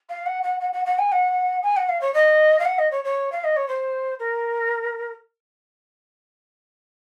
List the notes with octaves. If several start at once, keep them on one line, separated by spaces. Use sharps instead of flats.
F5
F#5
F#5
F#5
F#5
F#5
G#5
F#5
G#5
F#5
F5
C#5
D#5
F5
F#5
D#5
C#5
C#5
F5
D#5
C#5
C5
A#4